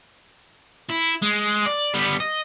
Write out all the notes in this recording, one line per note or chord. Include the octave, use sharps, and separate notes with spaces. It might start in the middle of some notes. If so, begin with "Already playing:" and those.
E4
G#3
D5
G3 B3
D#5